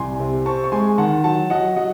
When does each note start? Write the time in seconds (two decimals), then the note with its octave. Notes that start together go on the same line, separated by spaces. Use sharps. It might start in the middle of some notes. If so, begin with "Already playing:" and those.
Already playing: C2 G#5 C6
0.20 C3
0.46 C4 A5 C#6
0.64 C#6
0.72 G#3 G#5 C6
0.98 D#3 F#5 A5
1.24 F#3 F#5 A5
1.50 F#3 D#5 F#5
1.76 F#3 D#5 F#5